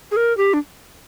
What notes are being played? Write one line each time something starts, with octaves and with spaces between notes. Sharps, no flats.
G#4
A#4
G4
D4